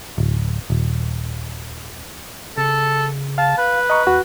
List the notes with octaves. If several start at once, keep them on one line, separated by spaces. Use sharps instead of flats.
D1
D#1
C#3 A4
F5 A5
B4
D#5 A#5 C#6
E2 F#4